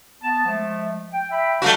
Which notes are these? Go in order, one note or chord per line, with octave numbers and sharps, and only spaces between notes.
B3 A5
F3 G#3 A3
G5
E5 G5 B5
G3 A3 A#3 D4 F#4